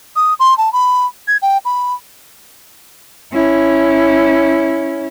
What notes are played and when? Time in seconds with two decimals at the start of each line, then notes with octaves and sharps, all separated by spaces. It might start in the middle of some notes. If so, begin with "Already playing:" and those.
0.16 D#6
0.40 C6
0.58 A5
0.73 B5
1.28 G#6
1.42 G5
1.65 B5
3.33 C#4 E4